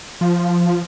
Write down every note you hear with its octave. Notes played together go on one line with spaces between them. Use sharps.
F3